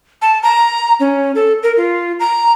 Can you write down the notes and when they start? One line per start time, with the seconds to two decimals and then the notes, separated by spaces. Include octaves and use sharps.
0.22 A5
0.43 A#5
1.00 C#4
1.35 A4
1.63 A#4
1.77 F4
2.20 A#5